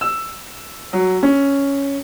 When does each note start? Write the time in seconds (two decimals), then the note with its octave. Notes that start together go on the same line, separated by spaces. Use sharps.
0.01 E6
0.93 F#3
1.23 C#4